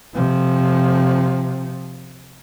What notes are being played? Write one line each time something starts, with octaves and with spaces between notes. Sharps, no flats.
C3 F3